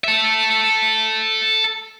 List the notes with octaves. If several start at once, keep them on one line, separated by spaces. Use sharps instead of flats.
A4 E5